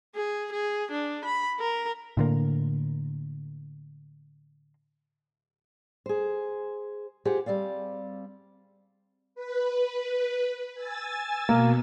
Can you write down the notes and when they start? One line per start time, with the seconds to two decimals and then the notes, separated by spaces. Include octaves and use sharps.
0.15 G#4
0.52 G#4
0.91 D4
1.25 B5
1.60 A#4
2.17 A2 D3 A#3
6.06 G#4 C5
7.25 F4 G4 G#4 C5 F#5
7.46 G3 C4 D5 F5
9.35 B4
10.74 G#5 E6 A6
11.49 B2 A#3